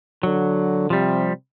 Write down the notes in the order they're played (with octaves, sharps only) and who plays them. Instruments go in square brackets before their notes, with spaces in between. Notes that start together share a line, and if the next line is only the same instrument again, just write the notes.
[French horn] D3 [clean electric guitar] F#3
[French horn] C3 [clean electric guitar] F3 G3